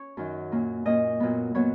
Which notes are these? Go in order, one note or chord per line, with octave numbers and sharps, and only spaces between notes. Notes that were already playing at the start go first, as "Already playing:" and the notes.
Already playing: C#4 C#5
F#2 D#3 F#3
A#2 A#3 C#4
A#2 A#3 C#4 D#5
A#2 F#3 B3
A#2 F#3 B3 C#5